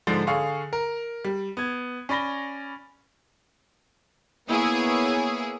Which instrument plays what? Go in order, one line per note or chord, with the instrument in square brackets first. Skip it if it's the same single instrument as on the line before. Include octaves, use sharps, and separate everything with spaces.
[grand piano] G#2 D3 F3
D3 G#4 F5 C#6
A#4 A#5
G3
B3 G#6
C#4 D5 B5 A#6 G7
[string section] A#3 B3 E4 G#4 C#5